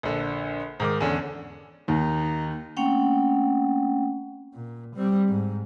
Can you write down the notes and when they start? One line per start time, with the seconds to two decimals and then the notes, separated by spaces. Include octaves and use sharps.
0.03 A#1 D3
0.80 G#2 D#3 D6
1.01 E2 D3 C#4
1.88 D#2 D#4
2.77 A3 A#3 C4 C#4 F#5 G5
4.54 A#2
4.96 G3 C4
5.28 G#2